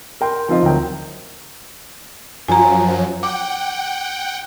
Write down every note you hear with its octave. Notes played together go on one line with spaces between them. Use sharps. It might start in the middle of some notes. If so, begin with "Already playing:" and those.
A#4 G5 C6
F3 C4 D#4 F4 C5 D#5
D2 F#3 A#4 G5
F#2 F3 F#3 G#5 A#5
F#5 G5 D6